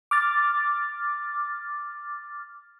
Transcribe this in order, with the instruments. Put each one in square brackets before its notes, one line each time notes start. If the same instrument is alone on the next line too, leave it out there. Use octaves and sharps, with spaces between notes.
[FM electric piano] D6 F6 A6